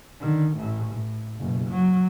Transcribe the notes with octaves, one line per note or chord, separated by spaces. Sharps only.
D3 D#3
A1 A2
A2
F#1 B2
F#3